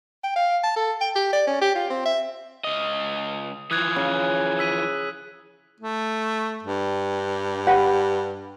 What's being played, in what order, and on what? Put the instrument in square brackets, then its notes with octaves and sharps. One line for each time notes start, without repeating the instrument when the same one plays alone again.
[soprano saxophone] G5
F5
A5
A4
G5
G4
D5
C#4
G4
F4
C4
E5
[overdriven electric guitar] C#2 D#5 [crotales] D#6
[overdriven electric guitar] E3 F3 [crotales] D#6 F#6 G#6
[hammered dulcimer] C#3
[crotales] E6 B6 D#7
[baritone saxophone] A3
G2
[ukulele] G4 B4 F#5